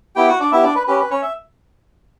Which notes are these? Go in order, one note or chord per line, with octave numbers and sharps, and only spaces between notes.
B3 E4 G4 G5
F#4 F#5
D4 D5
B3 E4 G4 E5
D4 D5
B4
C#4 G4 B4
B4
C#4 C#5
E5